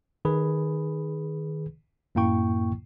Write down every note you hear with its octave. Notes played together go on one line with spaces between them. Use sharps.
D#3 G#4 B4 B5
F#2 A2 A#3 E4 G5 C#6